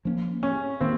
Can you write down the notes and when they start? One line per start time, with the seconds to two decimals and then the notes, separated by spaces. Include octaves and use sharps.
0.05 F3 A#3 C#4
0.43 C#4
0.81 D#3 A#3 C4